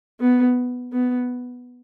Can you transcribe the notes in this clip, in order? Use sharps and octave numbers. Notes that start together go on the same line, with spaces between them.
B3
B3